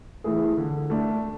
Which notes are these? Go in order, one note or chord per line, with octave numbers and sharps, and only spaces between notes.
E3 A3 E4 G#4
D3
A3 D4